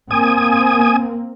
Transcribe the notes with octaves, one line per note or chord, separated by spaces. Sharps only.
A#3 C4 G#5 D#6